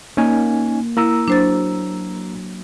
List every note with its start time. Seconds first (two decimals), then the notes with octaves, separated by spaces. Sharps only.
0.17 A#3 C#4 D#4 G#5
0.97 A#3 E4 A#5 E6
1.28 F#3 D4 C5 A6